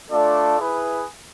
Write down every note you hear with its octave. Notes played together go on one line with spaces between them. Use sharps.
A3 D4 F4 A4 D5
E4 G#4 B4